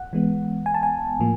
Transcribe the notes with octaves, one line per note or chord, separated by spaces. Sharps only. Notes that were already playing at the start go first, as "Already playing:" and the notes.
Already playing: F#5
E3 G#3 B3
G#5
A5
G#5
A2 F3 A#3